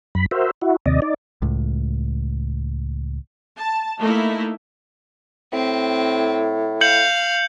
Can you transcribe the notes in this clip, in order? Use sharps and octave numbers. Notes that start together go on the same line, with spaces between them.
F#2 B5
F#4 A#4 C5 E5
E4 F#4
D#2 C3 D5 D#5
D#4 D5
C#2 A2
A5
A3 A#3 D#4 E4
A2 C4
F5 G6 C#7 F#7